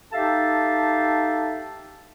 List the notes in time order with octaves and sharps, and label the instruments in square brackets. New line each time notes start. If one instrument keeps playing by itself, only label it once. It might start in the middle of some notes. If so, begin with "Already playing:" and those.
[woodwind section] D#4 G4 A4 E5 F5 A5